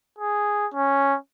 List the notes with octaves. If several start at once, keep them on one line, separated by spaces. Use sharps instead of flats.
G#4
C#4